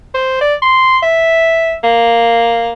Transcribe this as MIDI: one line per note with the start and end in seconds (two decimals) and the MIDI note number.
0.15 0.38 72
0.41 0.54 74
0.62 0.98 84
1.03 1.73 76
1.84 2.72 58